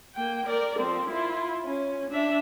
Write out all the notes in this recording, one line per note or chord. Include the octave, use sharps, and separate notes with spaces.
A#3 G5
A#4 D5
F3 C4
E4 F4
C#4
D4 E5